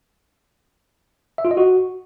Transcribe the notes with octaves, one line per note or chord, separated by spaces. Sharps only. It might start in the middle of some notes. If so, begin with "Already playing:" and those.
E5
F4
D#5
F#4